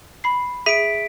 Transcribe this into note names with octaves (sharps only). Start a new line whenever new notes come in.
B5 C7
G#4 E5 B6 D7 D#7